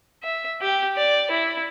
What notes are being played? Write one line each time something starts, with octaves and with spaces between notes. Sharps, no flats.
E5
G4
D5
E4